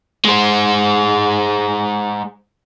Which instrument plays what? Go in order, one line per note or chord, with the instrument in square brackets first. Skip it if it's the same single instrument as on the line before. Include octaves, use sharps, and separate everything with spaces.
[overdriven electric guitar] G#3 C5